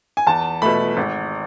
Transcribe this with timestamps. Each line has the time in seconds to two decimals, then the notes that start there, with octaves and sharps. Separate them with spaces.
0.17 G#5
0.27 E2 A5
0.62 B2 A3 B5
0.97 G#1